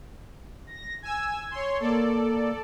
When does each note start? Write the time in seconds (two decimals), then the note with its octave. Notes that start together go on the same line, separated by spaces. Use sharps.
0.67 A#6
1.03 G#5 E6 G#6
1.51 C#5 C6
1.80 A#3 A4 D5